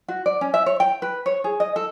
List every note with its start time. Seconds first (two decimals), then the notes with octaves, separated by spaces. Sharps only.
0.08 F#4
0.26 D5
0.41 C#4
0.54 E5
0.66 C#5
0.80 G5
1.02 B4
1.26 C#5
1.44 G#4
1.60 D#5
1.76 A4